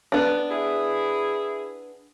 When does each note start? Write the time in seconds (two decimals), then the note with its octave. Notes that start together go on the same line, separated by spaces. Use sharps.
0.12 B3 D4
0.50 E4 G#4